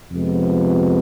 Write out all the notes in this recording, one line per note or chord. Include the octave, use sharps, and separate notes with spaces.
F2 C3 F3 G#3 B3